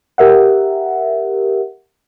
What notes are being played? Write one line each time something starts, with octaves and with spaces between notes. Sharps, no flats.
G4 A#4 E5 F#5